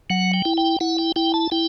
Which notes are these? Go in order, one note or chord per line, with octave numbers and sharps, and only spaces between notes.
F#3 F#5
G5
E4
G5
E4 F#5
G5
E4 G5
A5
E4 G5